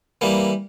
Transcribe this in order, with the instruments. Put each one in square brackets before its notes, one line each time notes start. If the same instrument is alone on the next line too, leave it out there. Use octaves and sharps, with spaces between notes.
[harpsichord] E3 G3 A#3